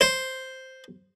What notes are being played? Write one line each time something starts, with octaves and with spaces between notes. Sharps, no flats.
C5